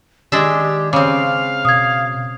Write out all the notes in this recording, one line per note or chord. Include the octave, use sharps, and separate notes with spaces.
D#3 G#3 D4 G4 E5
C#3 C4 F5 D6
B2 D#6 G#6